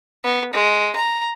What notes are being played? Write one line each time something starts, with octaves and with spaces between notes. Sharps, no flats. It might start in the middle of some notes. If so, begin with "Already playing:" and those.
B3
G#3
A#5